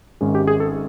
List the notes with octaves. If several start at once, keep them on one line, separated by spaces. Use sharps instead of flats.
G#1 G#2 D#3 G#3 C#4
G4
G#4
A4